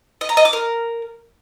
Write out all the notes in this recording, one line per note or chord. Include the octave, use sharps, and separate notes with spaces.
D#5
A#5
D#5
D6
A#4